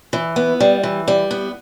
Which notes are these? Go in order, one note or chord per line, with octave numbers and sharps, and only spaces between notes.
E3
B3
G3
E3
G3
B3